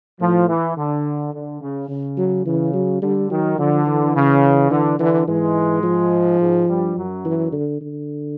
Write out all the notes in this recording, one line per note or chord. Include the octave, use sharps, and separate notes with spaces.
A2 F3
E3
D3
D3
C#3
C#3
F#3
C#3 E3
F#3
D3 G3
D#3 F#3
D3 F3
E3
C#3
D3 E3
D3 E3
G#2 E3 G#3
F3
G#2 G#3
G2 G3
F#2 F#3
E3
D3
D3